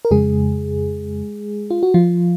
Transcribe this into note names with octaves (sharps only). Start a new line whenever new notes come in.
A#4
F2 C#3 G#3 G#4
F4
F#4
F3 F4